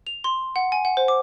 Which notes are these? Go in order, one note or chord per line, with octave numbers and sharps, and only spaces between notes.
F7
C6
F#5
G#5
F#5
C5
D6